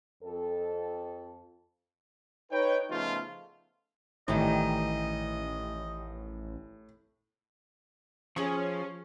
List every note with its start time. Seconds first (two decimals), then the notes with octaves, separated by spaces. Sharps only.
0.23 F2 A4
2.51 D#4 B4 C#5 G5
2.90 C#3 F3 A3 B3 D#4 F4
4.28 A1 A2 D#3 E3 G3 D#5
8.36 F3 C#4 G#4 C#6 D#6